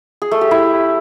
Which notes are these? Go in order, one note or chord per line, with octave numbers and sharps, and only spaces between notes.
G#4
A3
G4
E4